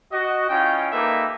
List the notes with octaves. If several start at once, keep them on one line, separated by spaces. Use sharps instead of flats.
F#4 D#5
C#4 E4 F4 D#5 G5
A#3 D#4 G4 A4 B4 E5